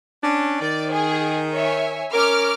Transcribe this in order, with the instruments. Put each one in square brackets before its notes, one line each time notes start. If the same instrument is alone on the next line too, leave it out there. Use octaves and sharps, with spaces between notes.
[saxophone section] C#4 D4
[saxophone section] D#3 [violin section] D5
[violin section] G#4
C#5 E5 G#5
[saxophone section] C#4 A#4 [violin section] D6 F6